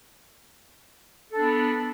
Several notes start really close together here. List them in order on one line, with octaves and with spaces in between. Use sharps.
A4 D4 B3